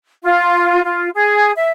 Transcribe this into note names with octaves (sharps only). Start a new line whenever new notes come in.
F4
F4
G#4
E5